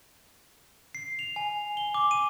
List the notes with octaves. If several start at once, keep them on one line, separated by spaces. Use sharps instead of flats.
C7
F7
G#5
G7
D6
D#7